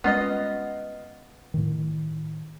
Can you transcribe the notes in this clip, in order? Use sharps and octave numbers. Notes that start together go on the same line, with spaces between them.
G3 G#3 B3 C#4 F4 D#5
A2 D#3